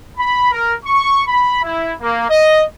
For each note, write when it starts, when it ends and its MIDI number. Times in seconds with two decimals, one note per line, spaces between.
0.17 0.50 83
0.51 0.73 70
0.85 1.22 85
1.27 1.61 83
1.63 1.93 64
2.00 2.26 58
2.28 2.63 75